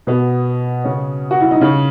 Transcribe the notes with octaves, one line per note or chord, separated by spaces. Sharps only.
B2 B3
C#3 C#4
F#4
E4
D#4
C#3 C#4